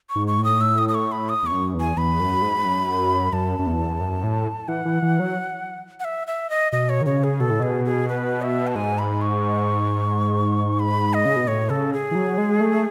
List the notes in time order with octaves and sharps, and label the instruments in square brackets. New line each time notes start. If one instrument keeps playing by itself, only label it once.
[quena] C#6
[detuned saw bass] G#2
[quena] C#6
[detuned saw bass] A2
[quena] D#6
E6
D#6
D#6
C#6
B5
D#6
[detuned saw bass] E2 [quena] C#6
[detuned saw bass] F#2
E2
[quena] G#5
[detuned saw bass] E2 [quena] B5
[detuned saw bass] F#2
G#2
F#2
[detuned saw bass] F#2 [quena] A5
[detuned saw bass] F#2
E2
F#2
A2
[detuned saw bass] E3 [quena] F#5
[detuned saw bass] E3
E3
F#3
[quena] F#5
E5
E5
D#5
[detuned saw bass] B2 [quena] D#5
[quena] C#5
[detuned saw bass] D#3
[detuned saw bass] C#3 [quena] C#5
[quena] G#4
[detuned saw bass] B2 [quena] A4
[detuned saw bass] A2
[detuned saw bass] B2 [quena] G#4
[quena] G#4
B4
E5
A5
[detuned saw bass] G#2 [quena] G#5
[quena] B5
C#6
B5
D#5
[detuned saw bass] C#3
B2
[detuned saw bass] A2 [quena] C#5
[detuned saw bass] C#3 [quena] A4
[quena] G#4
[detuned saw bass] E3
F#3
G#3
A3